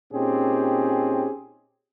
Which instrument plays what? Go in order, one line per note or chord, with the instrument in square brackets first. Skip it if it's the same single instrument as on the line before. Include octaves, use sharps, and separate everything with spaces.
[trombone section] A#2 C4 C#4 D#4 G4 G#4